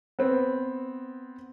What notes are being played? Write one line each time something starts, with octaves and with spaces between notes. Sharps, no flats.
B3 C4